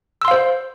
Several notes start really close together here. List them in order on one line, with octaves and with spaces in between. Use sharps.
E6 C6 F5 C5